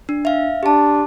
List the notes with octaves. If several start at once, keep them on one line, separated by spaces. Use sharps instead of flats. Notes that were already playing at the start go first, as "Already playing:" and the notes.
D4
E5 F5
D4 G4 A5